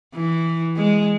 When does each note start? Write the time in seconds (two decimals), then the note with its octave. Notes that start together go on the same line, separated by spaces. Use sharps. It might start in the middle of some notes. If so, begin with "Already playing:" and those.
0.15 E3
0.77 G#3